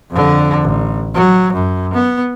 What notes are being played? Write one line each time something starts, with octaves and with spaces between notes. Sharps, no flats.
F2 D3
A1
F#3
F#2
B3